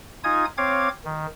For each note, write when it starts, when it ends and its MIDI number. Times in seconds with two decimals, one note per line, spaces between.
0.24 0.45 63
0.24 0.45 65
0.24 0.45 80
0.24 0.45 87
0.24 0.45 92
0.58 0.89 60
0.58 0.89 73
0.58 0.89 77
0.58 0.89 86
0.58 0.89 92
1.05 1.26 51